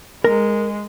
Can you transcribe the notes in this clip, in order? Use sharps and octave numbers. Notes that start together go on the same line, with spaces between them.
G#3 A#4 A#5